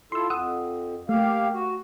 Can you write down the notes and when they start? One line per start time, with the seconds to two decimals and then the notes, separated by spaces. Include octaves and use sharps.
0.12 E4 F4 A4 C6 E6
0.30 F2 F#5 D#6 E6
1.09 A3 A#3 G4 F5
1.54 F#4